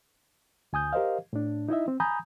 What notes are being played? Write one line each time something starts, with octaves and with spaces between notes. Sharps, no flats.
D2 G#5 D#6 G6
G4 A#4 C5 D#5 F5
A2 D4
D#4 E4 D#5 E5
C4
G#5 A#5 B5 D#6 G6